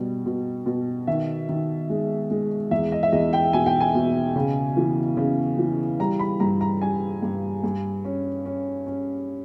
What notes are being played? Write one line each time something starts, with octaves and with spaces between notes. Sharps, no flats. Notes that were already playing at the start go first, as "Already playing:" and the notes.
Already playing: B2 G3
B2
B2
D#3 E5
D#3
G#3
G#3
E2 E5
D#5
E5
E2 D#5
G5
B2 G#5
G5
G#5
B2
C#3
E3
C#3
E3
G3 A#5
B5
G2 A#5
A#5
G3 G#5
G2
G2
C#4
C#4
C#4